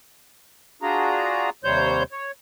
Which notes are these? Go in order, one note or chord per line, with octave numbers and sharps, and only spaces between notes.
D4 F4 F#4 G#4 A#5
D#2 C3 G3 C5 C#5 G6
C#5